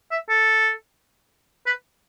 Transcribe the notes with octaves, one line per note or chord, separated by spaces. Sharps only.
E5
A4
B4